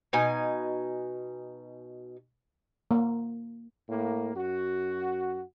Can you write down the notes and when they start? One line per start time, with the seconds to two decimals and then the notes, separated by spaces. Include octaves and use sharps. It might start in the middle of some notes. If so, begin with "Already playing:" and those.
0.13 B2 D#4 G#5
2.91 A#3
3.89 A2 A#3
4.35 F#2 F#4